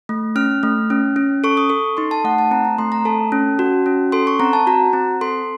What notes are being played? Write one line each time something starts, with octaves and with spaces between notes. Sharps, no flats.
A3
C#4 F6
A3
C#4
C#4
A4 C#6
D#6
A4 C#6
D#4 C6
A5
A3 F#5
A5
C4 A#5
A#5
A3 C6
A#5
A4 A5
C#4
F#4
C#4
A4 C6
C#6
C4 A#5
A5
F#4 A#5
C4
A4 C6